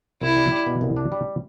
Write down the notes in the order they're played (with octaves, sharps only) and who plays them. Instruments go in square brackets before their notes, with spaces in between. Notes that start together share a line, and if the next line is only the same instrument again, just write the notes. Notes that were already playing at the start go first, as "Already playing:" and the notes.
[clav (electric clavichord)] C2 [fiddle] E4
[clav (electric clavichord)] G3
G3
B2
C2
D4
G3